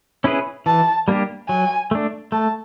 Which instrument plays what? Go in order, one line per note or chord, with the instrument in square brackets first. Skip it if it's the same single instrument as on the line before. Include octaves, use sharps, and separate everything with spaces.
[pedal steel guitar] C#4 E4 G#4 B4
[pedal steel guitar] E3 [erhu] A5
[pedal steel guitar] G3 A#3 D4 G4
[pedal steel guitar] F#3 [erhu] G#5
[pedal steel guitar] A3 D4
[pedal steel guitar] A3 [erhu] A5